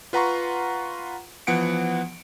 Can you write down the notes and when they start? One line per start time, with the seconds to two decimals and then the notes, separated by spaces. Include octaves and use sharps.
0.13 F4 B4 F#5 A#5 C6 C#6
1.47 E3 F3 B3 F#5 C#7 D7